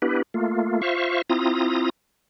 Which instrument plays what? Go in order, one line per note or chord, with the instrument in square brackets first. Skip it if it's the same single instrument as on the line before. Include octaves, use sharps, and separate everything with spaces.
[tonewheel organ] B3 D4 E4 G4 B4
A3 A#3 F4
F4 C5 E5 F5 C#6
C4 E4 F4 A#5 D#6